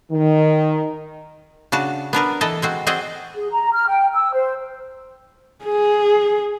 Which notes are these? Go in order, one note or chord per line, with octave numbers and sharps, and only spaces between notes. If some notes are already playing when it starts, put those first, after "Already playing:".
D#3
C#3 D4 F#4 A5
B3 D4 A#4 B4
E3 A4 D#5 A5
G#3 C4 F#4
C4 F#4 G#4 D5 D#5
G#4
A#5
F6
G5
E6
C5
G#4